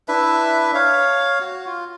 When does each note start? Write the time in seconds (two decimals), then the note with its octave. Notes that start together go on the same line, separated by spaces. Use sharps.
0.08 D4 E4 B4 E5
0.75 C#5 F5
1.41 F#4
1.66 F4